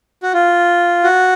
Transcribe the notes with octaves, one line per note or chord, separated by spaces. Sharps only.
F#4
F4
F#4